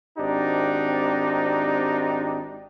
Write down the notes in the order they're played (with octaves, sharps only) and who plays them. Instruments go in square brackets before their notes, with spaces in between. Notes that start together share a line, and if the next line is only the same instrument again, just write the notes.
[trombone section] G#1 C4 D4 D#4 G4